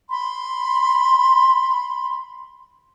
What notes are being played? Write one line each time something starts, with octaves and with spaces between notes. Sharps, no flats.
B5 C6